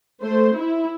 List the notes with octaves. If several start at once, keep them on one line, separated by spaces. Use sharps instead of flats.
A3 C5
E4